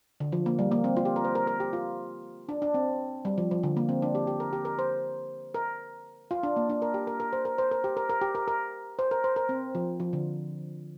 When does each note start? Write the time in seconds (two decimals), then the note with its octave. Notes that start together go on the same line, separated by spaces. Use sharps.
0.20 D3
0.32 F3
0.46 A#3
0.59 G3
0.72 A#3
0.84 C4
0.97 F4
1.05 G4
1.16 A#4
1.24 C5
1.35 A#4
1.47 A#4
1.60 G4
1.73 F4
2.49 D4
2.62 D4
2.74 C4
3.25 G3
3.38 F3
3.51 F3
3.63 D3
3.77 A#3
3.89 C4
4.02 D4
4.15 G4
4.27 G4
4.40 A#4
4.53 G4
4.65 A#4
4.79 C5
5.55 A#4
6.31 F4
6.43 D4
6.56 A#3
6.70 D4
6.82 A#4
6.94 G4
7.07 A#4
7.20 A#4
7.33 C5
7.45 A#4
7.58 C5
7.72 A#4
7.84 G4
7.97 A#4
8.10 A#4
8.21 G4
8.35 A#4
8.48 A#4
8.99 C5
9.11 A#4
9.24 C5
9.36 A#4
9.49 C4
9.75 F3
10.00 F3
10.13 D3